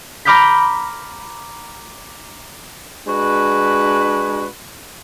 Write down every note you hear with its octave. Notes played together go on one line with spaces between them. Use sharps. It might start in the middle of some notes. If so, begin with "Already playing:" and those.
A#5 B5 D6 F6 G6 B6
G#3 D4 F#4 B4